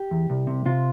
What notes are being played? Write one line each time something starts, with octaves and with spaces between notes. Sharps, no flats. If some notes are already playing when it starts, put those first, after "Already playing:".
Already playing: G4
E2
C2
C3
C3 F4